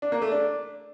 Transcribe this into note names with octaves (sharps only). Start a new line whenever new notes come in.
D4
A#3
A3
D4